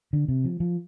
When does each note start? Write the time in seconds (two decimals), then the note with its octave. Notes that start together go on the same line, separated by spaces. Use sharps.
0.13 D3
0.28 C3
0.44 F3
0.60 F3